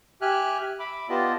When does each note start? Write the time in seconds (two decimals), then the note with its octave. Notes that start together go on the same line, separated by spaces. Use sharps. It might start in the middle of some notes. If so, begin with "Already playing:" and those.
0.22 G4 E5 G#5 F6 F#6
0.79 E5 B5 D6
1.09 B3 F4 G4 D5 D#5 A5